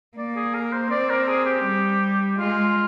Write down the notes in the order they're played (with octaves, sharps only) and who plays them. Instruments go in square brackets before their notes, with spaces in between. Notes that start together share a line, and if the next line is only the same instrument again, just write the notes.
[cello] A#3 [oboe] D5
[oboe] G#4
A#4
C5
[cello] C4 [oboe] D5
[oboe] A#4
G#4
G4
[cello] G3
[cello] G#3 [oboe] F4